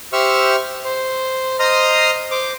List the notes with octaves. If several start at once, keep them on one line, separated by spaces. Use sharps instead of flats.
G4 C5 E5 C#6 E6 F6
C5
C5 D#5 A#5 C6 D#6 F6
C5 D6